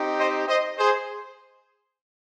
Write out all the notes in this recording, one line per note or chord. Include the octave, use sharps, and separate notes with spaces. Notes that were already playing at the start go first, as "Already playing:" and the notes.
Already playing: C4 D#4 G4
C5 D#5
C5 D#5
G#4 C5